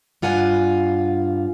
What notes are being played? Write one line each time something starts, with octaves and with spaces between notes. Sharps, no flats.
G2 F4 F#5 G#5